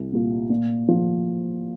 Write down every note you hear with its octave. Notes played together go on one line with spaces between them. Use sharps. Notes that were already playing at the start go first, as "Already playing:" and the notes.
Already playing: C2
A#2 G3 A#3 F4
A#2
F3